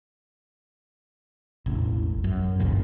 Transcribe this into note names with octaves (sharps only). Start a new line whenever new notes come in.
E1 A1
F#2
G1 C#2 A#2